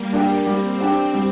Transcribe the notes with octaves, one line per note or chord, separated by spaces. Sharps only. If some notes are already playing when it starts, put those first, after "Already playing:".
Already playing: G3 A#3
D4 G4
G3 C4
D4 G4
G3